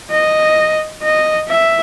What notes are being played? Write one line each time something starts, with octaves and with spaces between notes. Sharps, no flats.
D#5
D#5
E5